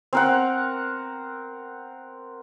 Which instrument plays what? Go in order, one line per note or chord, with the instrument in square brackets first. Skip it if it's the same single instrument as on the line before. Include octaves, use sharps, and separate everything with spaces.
[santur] C4 A#4 F#5